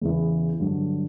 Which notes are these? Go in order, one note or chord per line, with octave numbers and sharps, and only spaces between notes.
E2 C#3 E3
G2 D3 F#3